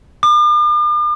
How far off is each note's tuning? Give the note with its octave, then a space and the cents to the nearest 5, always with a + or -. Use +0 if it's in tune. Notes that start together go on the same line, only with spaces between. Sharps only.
D6 +45